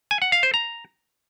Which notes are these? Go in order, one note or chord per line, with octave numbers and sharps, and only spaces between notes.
G#5
F#5
F5
C5
A#5